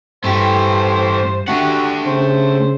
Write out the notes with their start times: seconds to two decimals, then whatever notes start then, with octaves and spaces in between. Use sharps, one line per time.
0.24 G2 E3 A3 G4 C5
1.48 A3 D4 F#4 G4 F#5
2.06 C#3 C5